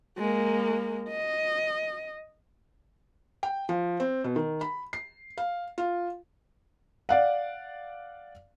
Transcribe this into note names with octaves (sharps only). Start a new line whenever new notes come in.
G#3 A#3
D#5
G5
F3
C4
B2
D#3
B5
C7
F5
F4
D5 F5 F#5